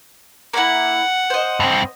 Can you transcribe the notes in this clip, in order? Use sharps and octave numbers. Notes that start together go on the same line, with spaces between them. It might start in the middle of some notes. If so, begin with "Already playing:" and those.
A#3 E4 F#5
C5 D#5
G2 C4